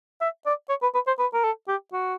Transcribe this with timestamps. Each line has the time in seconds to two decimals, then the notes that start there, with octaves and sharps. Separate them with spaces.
0.21 E5
0.46 D5
0.69 C#5
0.82 B4
0.94 B4
1.07 C5
1.19 B4
1.33 A#4
1.44 A4
1.68 G4
1.93 F#4